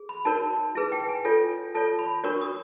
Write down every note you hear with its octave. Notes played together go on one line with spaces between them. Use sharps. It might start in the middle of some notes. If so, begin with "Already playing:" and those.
Already playing: G#4
B5
D#4 F#4 A#4 C#5 A5
E4 G#4 B4 A5
G5
G#5
F4 A4 C#5
F4 A4 C#5 A5
B5
D4 F#4 A#4 C#5 C#6
D#6